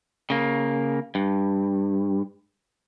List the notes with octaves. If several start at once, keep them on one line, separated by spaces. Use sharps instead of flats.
C#3 A#3
G2